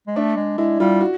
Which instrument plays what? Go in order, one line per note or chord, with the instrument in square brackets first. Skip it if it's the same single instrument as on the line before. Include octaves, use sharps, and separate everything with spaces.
[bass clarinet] G#3
[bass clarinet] A3 [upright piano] D4
[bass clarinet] G#3
[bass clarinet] G#3 [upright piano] E4
[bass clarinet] G3 [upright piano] F4
[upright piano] F#4